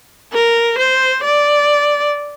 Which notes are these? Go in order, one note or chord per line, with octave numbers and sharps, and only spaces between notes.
A#4
C5
D5